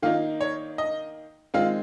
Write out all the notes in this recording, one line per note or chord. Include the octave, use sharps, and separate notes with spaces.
D#3 A#3 D#4 F4 F5
C#5
D#5
D#3 G#3 C4 F4 F5